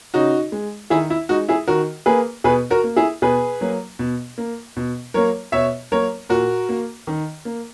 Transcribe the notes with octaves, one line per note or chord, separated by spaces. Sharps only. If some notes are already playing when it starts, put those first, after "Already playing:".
C#3 D#4 F#4
G#3
D#3 E4 G#4
E4
G#3 D#4 F#4
E4 G#4
D#3 F#4 A#4
A#3 G#4 B4
B2 G#4 B4
F#4 A#4
A#3
E4 G#4
B2 G#4 B4
F#3 A#3
B2
A#3
B2
F#3 A#3 A#4 C#5
B2 C#5 E5
F#3 A#3 A#4 C#5
A#2 F#4 A#4
A#3
D#3
A#3